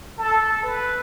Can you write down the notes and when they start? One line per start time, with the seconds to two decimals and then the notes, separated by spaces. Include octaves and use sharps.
0.18 A4
0.63 B4